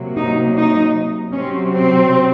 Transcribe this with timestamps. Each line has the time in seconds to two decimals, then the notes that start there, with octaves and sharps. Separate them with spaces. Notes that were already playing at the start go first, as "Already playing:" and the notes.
Already playing: C3 F#3 A#3
0.16 D#4
0.55 D#4
1.32 C3 F#3 C4 C#4
1.72 C4